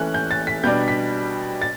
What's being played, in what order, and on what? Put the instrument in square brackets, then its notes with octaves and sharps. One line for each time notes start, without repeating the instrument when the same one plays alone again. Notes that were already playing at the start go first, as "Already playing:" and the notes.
Already playing: [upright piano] E3 A3 C#4 F#6
G6
A6
B6
B2 G3 D4 G6
B6
A6